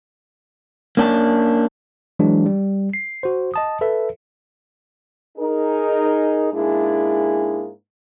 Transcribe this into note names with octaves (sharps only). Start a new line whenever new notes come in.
A#3 C#4 D4 B4 A5
E3 F#3 G#3 D4
G3
C7
F#4 C5
D#5 A5 D#6
A4 B4 E5
D#4 G#4 A#4
G#2 A#3 D4 E4 G#4